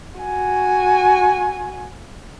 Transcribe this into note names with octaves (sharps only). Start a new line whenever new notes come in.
F#4 G#5